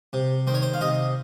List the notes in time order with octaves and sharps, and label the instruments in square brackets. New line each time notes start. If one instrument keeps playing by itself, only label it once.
[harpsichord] C3
D#3 C5
C#5
C5
F5
C3 D#5